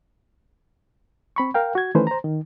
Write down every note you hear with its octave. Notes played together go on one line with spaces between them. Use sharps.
C4 B5 C#6
A#4 F5 G5
F#4 G#6
D#3 E3 A3 C#4 B4 C5
C5 A#5
D#3